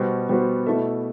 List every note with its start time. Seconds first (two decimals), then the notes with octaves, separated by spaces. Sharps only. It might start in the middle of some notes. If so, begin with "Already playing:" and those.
Already playing: B2 G3 B3 F#4 C5
0.29 B2 G3 B3 F#4 C5
0.66 B2 A3 E4 A4 E5